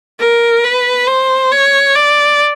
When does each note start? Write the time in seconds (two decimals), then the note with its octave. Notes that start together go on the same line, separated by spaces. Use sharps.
0.20 A#4
0.64 B4
1.07 C5
1.51 C#5
1.95 D5